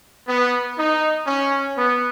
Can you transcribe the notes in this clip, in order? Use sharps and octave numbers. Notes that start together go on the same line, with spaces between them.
B3
D#4
C#4
B3